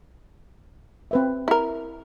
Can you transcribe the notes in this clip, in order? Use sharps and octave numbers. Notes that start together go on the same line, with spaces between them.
C4 B4 E5
E4 A#4